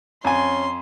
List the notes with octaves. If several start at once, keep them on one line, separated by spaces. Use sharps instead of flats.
F2 C#4 G#5 C6